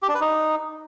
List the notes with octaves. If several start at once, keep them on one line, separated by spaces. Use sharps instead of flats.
G4
D4
B4
D#4